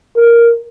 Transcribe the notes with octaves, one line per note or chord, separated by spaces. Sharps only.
A#4